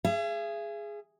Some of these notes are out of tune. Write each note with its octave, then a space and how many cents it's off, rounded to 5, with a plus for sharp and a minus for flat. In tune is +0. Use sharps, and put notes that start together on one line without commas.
G#4 +0 E5 +45